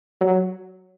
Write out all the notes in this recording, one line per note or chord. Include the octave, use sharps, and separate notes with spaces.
F#3